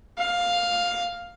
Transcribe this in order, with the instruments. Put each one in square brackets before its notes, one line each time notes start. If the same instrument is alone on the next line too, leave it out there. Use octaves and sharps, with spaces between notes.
[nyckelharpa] F5